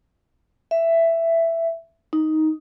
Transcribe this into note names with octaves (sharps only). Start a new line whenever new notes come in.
E5
D#4